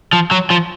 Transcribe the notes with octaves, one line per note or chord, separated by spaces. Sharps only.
F3
F#3
F3